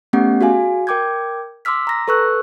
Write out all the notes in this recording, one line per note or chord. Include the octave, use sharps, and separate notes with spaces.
A3 B3 C#4 G4 F#5
F#4 G#4 F5 G#5
A#4 G5 D6 G6 G#6
C6 D6 E6 F6 B6
A#5 A#6
A4 B4 C#6 E6 F#6